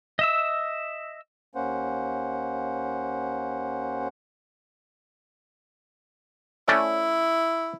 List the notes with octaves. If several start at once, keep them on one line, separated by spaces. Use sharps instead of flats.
D#5 E5 E6
D#2 A#3 C#4 C5 F#5
A3 C#4 E4 D5